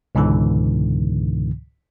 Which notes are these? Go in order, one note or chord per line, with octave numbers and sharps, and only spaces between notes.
C#2 G#2 B2 D3 E3